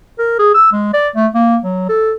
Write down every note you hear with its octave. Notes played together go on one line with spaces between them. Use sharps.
A#4
G#4
E6
G#3
D5
A3
A#3
F#3
A4